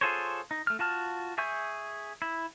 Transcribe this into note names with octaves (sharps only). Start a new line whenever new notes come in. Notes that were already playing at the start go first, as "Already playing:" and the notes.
F4 G#4 A4 C5 C#5
D#4
A3 F6
F4 F#4 A5 F6
G#4 E5 G#5 C#6 G6
E4